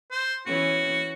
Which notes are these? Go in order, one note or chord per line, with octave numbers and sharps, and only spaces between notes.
C5
E3 B3 C#4 F#4